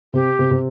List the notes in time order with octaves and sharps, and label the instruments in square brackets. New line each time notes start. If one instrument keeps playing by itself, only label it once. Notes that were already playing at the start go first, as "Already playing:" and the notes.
[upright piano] C3 [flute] G4
[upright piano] C3
C3